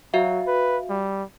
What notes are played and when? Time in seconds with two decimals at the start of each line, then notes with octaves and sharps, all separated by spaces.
0.14 F#3 F#4 E5 F5
0.47 B4
0.89 G3